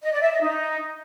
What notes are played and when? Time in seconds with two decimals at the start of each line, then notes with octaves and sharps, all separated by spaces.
0.02 D#5
0.12 D5
0.21 E5
0.31 D#5
0.41 D#4